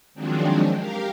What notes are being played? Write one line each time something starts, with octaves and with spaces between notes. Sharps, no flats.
D#3 F3 F#3 G#3 C4 D4
G4 A#4 F5